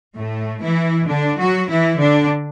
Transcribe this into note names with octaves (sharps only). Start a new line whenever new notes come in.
A2 A3
E3 E4
D3 D4
F#3 F#4
E3 E4
D3 D4